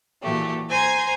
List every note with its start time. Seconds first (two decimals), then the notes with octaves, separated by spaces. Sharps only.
0.21 A#2 E3 F#3 A3 G4
0.69 C5 G#5 A#5 G#6